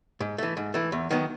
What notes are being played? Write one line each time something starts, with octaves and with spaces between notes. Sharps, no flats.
G#2
E3 A3
G#2
E3 A3
E2
D#3 F#3 B3